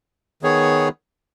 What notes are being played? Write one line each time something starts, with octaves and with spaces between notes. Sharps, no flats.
D#3 B3 G#4 C#5